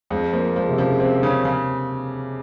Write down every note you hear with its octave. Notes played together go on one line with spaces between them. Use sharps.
F2 G#3
F3 A#3
F3 G#3
C3
C#3 F3
C4
C#3
C#3